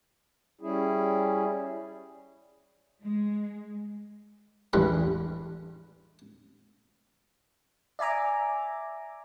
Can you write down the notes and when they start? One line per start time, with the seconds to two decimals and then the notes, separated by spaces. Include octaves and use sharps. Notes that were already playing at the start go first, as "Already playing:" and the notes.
0.61 G3 C#4 E4 G#4
3.03 G#3
4.73 A1 E2 G2 B4 G#5
7.99 D5 E5 G#5 A#5 D6